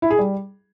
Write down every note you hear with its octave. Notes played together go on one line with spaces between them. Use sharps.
E4
G#4
G3